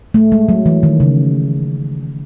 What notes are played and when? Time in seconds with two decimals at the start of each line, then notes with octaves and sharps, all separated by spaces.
0.14 A3
0.32 G#3
0.49 F#3
0.66 E3
0.83 D#3
1.00 C#3